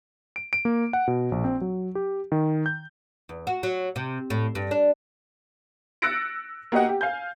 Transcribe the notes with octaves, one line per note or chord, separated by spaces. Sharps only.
D7
D7
A#3
F#5
B2
A#1
C4
F#3
G4
D#3
G6
E2
F#4
F#3
C3
A2
G2
D4
E6 F#6 A6 A#6 C#7 D7
A#3 F#4 G4 D#5 F#5
G4
F5 G#5 G6